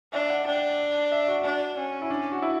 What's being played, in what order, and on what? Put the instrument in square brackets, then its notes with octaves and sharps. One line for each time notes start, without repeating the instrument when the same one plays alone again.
[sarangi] D4 [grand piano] E5
[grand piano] F#5
[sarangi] D4 [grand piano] G5
[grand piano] F#5
E5
F#4
[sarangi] D4
C#4
[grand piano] E4
D4
F#4
E4